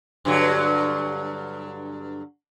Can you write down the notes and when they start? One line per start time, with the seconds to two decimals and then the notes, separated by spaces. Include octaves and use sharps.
0.25 G2 D3 F#3